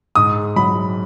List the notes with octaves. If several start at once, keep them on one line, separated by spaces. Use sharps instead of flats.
G#2 D#6
F#3 B5